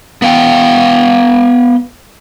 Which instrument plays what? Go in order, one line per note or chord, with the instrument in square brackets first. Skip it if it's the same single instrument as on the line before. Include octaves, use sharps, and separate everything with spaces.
[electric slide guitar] B3 F5 G5